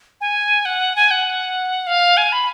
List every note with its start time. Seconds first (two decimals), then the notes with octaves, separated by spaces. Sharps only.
0.21 G#5
0.65 F#5
0.96 G#5
1.11 F#5
1.87 F5
2.17 G#5
2.32 B5